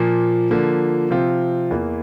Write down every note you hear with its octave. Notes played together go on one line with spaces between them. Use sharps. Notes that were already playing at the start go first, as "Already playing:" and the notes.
Already playing: A#2 F3 A#3
D3 F3 A#3
C3 F3 C4 F4
E2 E3 A#3